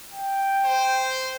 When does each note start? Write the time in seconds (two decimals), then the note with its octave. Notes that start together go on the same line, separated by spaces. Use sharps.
0.14 G5
0.65 C5